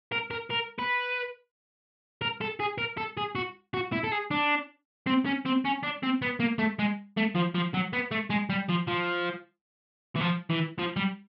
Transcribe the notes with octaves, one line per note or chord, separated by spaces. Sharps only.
A#4
A#4
A#4
B4
A#4
A4
G#4
A#4
A4
G#4
F#4
F#4
E4
A4
G#4
D4
C4
C#4
C4
C#4
D4
C4
B3
A#3
A3
G#3
A3
F3
F3
F#3
B3
A3
G#3
G3
F3
F3
E3
F3
E3
F3
G3